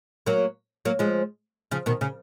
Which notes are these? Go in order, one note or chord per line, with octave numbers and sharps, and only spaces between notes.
F#3 A#3
F#3 A#3
F3 G#3
C#3 F3
B2 D#3
C#3